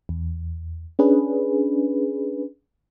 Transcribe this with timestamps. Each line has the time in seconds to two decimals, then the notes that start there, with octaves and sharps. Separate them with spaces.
0.09 E2
0.99 C#4 D4 G#4 B4